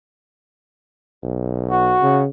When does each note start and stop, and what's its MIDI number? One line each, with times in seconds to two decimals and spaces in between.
1.23 1.96 35
1.71 2.21 66
2.01 2.27 49